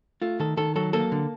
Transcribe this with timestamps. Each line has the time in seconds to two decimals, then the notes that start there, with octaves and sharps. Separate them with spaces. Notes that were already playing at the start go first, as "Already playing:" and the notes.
0.22 A3 F4
0.40 D#3 A4
0.57 D#3 A4
0.76 F#3 A4
0.93 A#3 A4
1.12 D3